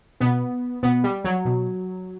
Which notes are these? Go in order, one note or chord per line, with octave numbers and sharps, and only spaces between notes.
B2 B3
B2 B3
G3
F#3
B2